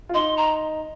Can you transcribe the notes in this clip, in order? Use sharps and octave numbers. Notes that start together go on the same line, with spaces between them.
F4
D#4 C6
A#5